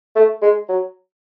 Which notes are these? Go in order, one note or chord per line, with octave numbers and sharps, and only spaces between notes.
A3
G#3
F#3